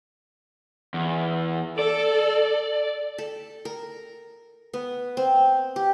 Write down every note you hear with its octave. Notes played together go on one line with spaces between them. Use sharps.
E2
A4 D5
A4
A#4
B3
C4
G4